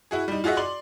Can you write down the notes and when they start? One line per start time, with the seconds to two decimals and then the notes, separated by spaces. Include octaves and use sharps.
0.11 E4 F#4 G#4
0.28 G3 D#4
0.44 F4 F#4 G#4 D#5 E5 F#5
0.57 D5 C6 F#7